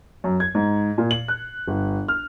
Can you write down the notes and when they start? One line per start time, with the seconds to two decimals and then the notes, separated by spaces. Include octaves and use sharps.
0.24 F#2
0.40 G#6
0.55 G#2
0.98 A#2
1.11 F#7
1.28 F#6
1.68 G1
2.08 F6